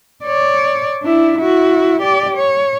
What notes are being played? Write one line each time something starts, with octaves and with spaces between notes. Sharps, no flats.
C#5 D5
D4 E4
E4 F#4
G4 D5
C#5